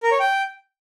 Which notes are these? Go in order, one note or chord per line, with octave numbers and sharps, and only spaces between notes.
A#4
C#5
G5